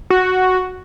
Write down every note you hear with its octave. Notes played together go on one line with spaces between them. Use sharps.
F#4